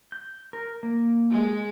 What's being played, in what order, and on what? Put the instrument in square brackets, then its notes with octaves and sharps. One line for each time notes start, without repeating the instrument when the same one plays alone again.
[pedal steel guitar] G6
A#4
A#3
[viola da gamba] G#3